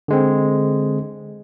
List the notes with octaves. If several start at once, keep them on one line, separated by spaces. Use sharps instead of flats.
D3 G#3 C4